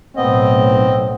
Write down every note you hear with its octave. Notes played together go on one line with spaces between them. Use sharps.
B1 A2 B3 C4 D#5